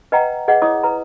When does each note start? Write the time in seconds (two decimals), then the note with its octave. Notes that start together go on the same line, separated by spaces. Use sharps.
0.12 B4 D#5 F#5 G5 A#5
0.48 G#4 B4 D#5 F#5
0.62 E4 C#5 D#5 D6 D#6
0.83 B4 A#5